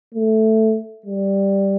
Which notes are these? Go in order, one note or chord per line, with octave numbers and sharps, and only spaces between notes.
A3
G3